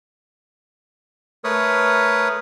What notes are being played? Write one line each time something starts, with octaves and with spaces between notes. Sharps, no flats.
A3 A#4 B4 C#5 D#6